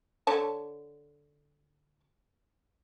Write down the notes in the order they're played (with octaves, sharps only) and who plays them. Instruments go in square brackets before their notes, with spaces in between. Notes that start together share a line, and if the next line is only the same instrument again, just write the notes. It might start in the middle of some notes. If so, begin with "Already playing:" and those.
[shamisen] D3 C#5 A5